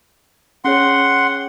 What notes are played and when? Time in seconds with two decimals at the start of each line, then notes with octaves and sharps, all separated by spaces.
0.65 C#4 G#4 C#5 F#5 C6